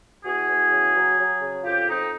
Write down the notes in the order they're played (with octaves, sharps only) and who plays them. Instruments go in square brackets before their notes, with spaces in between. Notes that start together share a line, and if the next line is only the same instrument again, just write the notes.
[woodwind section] E2 F#4 G#4
E2
C#3
F#3
F#3
C#3
F2 F4 G4
F2 D#4